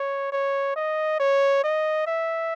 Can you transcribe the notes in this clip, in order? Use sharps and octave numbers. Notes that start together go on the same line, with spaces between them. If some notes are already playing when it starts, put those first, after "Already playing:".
Already playing: C#5
C#5
D#5
C#5
D#5
E5